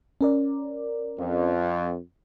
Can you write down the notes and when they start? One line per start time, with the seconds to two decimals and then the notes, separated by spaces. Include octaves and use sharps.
0.21 C#4 A#4 D5
1.19 F2